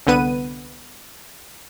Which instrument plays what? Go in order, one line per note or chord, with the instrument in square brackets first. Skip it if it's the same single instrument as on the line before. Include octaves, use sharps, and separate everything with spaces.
[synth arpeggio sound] C2 D3 B3 B4 D#7